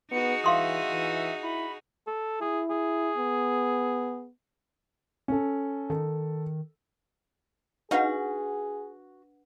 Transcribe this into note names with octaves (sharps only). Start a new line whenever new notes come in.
B3 D#4 F#4 G#4 C#7
E3 E5 F5 C6 D#6
E3
E4 B5
A4
E4 G#4
G#4
B3
C#4 A4
D#3 A4
D4 D#4 F#4 G#4 B4 F5 F#5